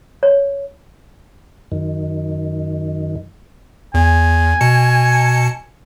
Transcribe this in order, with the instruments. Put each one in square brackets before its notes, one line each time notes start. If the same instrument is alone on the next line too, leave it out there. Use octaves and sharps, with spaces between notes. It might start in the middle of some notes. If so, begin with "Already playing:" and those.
[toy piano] C#5
[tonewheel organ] F#2 D#3
[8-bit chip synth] E2 [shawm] G#5
[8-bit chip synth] B2 A5 C#7